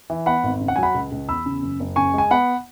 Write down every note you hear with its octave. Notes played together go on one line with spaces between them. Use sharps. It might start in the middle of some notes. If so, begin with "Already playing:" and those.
E3
B3 F#5 B5
G#1
C#3
F#5
F#3 G#5
F#5 B5
C#2
C#2
E2 B5 E6
C#3
F#1
F#1
C#3 G#5 C#6
G#3 G#5
B3 F#5 B5